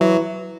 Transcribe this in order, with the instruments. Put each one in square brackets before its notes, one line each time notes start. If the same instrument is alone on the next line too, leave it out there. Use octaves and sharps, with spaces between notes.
[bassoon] E3 [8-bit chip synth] F#3